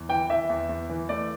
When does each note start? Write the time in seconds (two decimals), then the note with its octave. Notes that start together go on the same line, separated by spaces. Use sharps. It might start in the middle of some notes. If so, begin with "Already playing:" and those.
Already playing: E2
0.09 E3 G5
0.30 E3 E5
0.49 E2
0.69 E2
0.90 E3
1.09 A3 D5